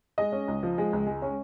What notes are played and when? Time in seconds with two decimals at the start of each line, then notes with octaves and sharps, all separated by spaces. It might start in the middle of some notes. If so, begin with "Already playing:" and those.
0.18 G#3 D#5
0.32 C#4
0.48 C#2
0.63 F3
0.78 G#3
0.93 C#2
1.07 G#3
1.22 C#4